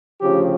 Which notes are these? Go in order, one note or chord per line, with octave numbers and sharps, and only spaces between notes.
D2 C#3 F3 G4